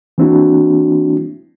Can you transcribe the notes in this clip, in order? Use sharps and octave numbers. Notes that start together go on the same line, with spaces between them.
E3 A#3 C4 D4 E4 F#4